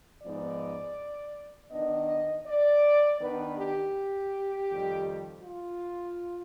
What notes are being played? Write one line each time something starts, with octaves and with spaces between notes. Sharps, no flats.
G#2 F3 B3 D#4 D5
D#3 B3 D4 D#5
D5
D#3 B3 D4 B4
G4
F2 D#3 G3
F4